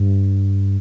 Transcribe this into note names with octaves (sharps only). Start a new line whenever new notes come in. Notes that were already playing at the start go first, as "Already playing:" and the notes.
Already playing: G2